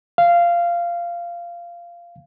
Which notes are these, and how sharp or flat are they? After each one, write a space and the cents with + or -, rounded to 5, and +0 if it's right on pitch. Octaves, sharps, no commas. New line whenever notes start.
F5 -15